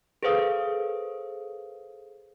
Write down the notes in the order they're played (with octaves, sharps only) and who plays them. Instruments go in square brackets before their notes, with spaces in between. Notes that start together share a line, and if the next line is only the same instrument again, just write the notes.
[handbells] G#4 A4 B4 C5 F5 D#6